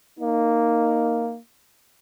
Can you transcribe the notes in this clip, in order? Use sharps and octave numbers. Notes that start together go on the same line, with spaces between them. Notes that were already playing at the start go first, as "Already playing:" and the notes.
A#3 D#4